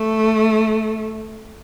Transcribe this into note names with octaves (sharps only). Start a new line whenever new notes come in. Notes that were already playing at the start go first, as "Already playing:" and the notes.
Already playing: A3